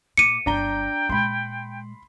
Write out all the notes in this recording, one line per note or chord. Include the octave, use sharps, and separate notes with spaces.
A#2 D6 C#7 D#7
G1 F#3 D4 G5 A#5 G7
A#2 G#3 B5 C6